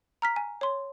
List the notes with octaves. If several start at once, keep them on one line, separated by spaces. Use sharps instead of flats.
A#5 F6 B6
G#5
C#5 C6